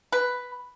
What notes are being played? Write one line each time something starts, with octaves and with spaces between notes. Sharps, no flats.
B4